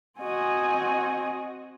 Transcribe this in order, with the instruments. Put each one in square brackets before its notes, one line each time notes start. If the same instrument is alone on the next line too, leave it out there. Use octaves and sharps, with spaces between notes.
[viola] C4 F#4 [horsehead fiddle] D#5 G#5